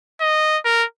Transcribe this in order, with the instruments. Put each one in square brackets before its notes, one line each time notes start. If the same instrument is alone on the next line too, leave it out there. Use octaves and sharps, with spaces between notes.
[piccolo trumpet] D#5
A#4